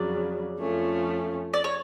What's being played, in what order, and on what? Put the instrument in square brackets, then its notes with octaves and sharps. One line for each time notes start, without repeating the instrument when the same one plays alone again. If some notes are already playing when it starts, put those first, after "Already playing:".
Already playing: [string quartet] F2 C#3 F#3 [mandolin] D5
[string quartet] F2 F3 A3 C#4
[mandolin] D5
C#5